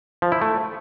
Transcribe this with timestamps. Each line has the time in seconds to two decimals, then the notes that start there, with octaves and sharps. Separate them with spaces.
0.22 F3
0.32 E4
0.42 A3